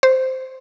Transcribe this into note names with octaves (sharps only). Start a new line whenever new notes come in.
C5